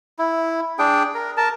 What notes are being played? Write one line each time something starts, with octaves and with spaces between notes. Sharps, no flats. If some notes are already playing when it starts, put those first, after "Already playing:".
E4
D4 G#4 G5
A#4
A#4 A5